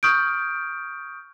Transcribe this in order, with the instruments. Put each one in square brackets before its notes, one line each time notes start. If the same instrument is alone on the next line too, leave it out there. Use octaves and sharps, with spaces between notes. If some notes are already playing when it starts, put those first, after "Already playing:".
[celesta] C#6 D#6 F6 G6 D7